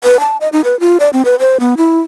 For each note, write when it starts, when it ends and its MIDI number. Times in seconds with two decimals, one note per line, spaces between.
0.04 0.20 71
0.20 0.37 81
0.41 0.49 75
0.52 0.61 63
0.64 0.78 71
0.80 0.97 65
1.00 1.09 74
1.13 1.22 60
1.25 1.35 71
1.39 1.57 72
1.60 1.74 59
1.77 1.99 64